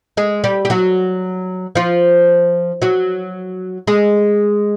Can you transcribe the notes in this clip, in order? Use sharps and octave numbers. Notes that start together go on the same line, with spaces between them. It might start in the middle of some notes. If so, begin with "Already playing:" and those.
G#3 G#4
G3 G4
G4
F#3 F#4
F3 F4
F#3 F#4
G#3 G#4